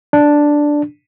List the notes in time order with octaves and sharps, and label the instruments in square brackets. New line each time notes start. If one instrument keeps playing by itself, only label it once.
[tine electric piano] D4